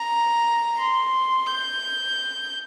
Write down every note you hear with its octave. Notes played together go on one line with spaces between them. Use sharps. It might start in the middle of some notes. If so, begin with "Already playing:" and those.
Already playing: A#5
C6
G6